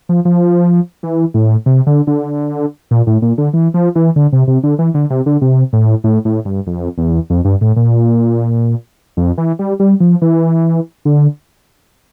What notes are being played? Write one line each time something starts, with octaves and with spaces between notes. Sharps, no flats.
F3
F3
E3
A2
C3
D3
D3
A#2
A2
A#2
D3
E3
F3
E3
D3
C3
C3
D3
E3
D3
C3
D3
C3
A2
A2
A2
G2
F2
E2
F2
G2
A2
A#2
F2
E3
G3
G3
F3
E3
D3